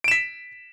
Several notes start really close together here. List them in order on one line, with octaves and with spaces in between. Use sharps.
D7 E7 B6